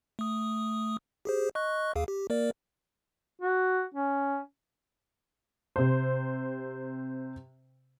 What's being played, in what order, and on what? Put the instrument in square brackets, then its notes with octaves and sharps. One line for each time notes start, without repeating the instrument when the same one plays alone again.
[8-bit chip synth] A3 D#6
G4 G#4 C5
D#5 C#6 F#6
D#2 G#4 F5
G4
A#3 A#4 D5
[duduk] F#4
C#4
[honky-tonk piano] C3 C5